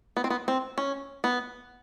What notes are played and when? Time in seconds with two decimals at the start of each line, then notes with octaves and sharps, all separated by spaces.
0.17 B3
0.24 C4
0.30 B3
0.48 C4
0.78 C#4
1.24 B3